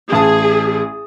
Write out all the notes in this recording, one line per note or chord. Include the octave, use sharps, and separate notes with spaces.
A1 G#4 A5 D#6